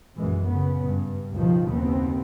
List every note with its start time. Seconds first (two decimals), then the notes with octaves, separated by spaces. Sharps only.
0.17 A#1 F#2 E3 G#3
0.47 C#3 B3
0.83 G2
1.33 C#2 G2 B2 D#3 F3
1.68 F#1 D#2 B3 C4